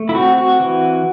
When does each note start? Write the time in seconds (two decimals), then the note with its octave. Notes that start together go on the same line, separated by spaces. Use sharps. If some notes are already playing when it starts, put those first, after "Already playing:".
Already playing: A3
0.09 E4
0.15 C4 F#4
0.38 F#4
0.60 E3